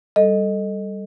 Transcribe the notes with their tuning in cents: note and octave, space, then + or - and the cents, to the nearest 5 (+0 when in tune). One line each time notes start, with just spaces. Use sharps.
G3 +0 A4 +0 D#5 +0